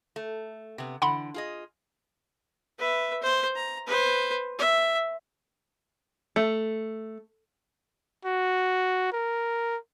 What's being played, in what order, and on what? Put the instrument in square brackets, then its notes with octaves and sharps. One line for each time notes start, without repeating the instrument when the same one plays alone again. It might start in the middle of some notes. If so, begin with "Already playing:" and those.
[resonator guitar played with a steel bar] A3
C3 B3
[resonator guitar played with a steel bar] D3 E3 [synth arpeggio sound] F#5 B5 C6
[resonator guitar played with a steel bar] F4 G#4 D#5
[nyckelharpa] B4 E5
C5
A#5
B4 C5
E5
[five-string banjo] A3
[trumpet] F#4
A#4